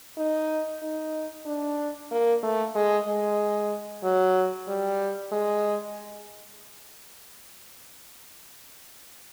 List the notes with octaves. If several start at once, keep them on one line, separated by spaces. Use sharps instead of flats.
D#4
D#4
D4
A#3
A3
G#3
G#3
F#3
G3
G#3